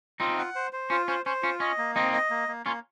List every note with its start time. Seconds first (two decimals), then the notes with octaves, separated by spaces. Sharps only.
0.20 C4 D#4 F4
0.38 F#5
0.55 C5
0.73 C5
0.90 C#4 F4
1.08 C#4 C5
1.26 C#4 C5
1.43 C#4 F4
1.60 C#4 D#5
1.78 A#3
1.95 C4 D#4 D#5
2.13 D#5
2.30 A#3
2.48 A#3
2.66 A#3 C#4 F4